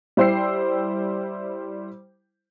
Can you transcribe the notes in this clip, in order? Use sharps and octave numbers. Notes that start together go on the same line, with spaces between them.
G3 E4 C5 G5 E6 C7